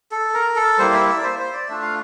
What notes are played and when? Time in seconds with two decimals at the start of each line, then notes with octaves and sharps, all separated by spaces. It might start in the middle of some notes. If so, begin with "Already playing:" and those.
0.12 A4
0.34 A#4
0.56 A4
0.78 G3 A#3 E4 C5
0.94 E5
1.09 E5
1.17 D5
1.23 C5
1.39 C5
1.53 D5
1.68 A3 D4 F4 E5
1.82 F5